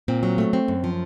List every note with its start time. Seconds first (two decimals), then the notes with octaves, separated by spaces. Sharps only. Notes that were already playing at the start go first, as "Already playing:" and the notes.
0.08 A#2 C4
0.23 F#3
0.38 A3
0.53 C4
0.68 F#2
0.84 F3